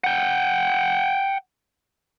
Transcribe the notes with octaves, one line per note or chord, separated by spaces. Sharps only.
F#5 G5